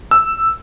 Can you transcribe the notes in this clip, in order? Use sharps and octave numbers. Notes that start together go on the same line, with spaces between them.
E6